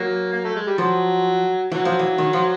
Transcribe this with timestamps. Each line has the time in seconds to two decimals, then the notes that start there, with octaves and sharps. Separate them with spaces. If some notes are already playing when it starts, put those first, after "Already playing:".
Already playing: F#3 A#3
0.32 A#3
0.44 A3
0.56 G#3
0.67 G3
0.78 F3 F#3
1.72 E3 F#3
1.85 F3
1.99 E3
2.18 D#3
2.33 F3